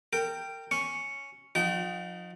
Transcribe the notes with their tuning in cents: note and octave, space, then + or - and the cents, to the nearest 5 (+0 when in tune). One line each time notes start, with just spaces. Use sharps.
A#4 -30 G5 +0
C#4 +0 C#6 +0
F3 +35 D#4 +0 G5 -35